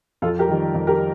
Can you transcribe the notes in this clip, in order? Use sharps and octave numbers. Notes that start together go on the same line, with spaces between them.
F2 F4 A4
G4 A#4
D#3 G3
F2
G4 A#4